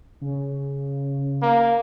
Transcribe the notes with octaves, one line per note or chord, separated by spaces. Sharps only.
C#3
A#3